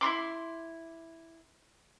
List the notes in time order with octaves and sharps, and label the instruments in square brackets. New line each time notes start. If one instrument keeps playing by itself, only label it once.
[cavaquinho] E4 F#4 C6 D6